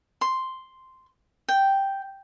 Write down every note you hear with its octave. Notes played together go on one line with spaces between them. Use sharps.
C6
G5